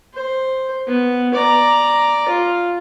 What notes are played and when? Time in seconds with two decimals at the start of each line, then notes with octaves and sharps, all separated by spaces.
0.14 C5
0.87 B3
1.34 D5 A#5
2.28 F4